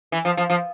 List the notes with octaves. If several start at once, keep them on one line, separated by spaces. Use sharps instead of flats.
E3
F3
F3
F3